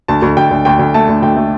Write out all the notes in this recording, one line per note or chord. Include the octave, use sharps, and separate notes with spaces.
D2 A5
D2
D2 G5
D2
D2 G5
D2
A3 A5
D2
D2 G5
A3